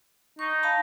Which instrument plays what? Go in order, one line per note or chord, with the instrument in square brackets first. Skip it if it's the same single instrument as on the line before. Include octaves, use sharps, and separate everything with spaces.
[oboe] D#4 [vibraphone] C#6
[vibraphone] F5 A5 B5